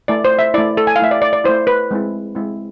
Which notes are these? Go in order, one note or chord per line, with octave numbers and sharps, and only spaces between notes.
A3 E4 D5
C5
E5
A3 E4 D5
A4
G#5
F5
A3 E4 E5
D5
D5
D5
A3 E4 C5
B4
G#3 C4 E4
G#3 C4 E4